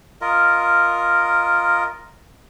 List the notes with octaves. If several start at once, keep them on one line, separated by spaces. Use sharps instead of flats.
F4 A#4 D#5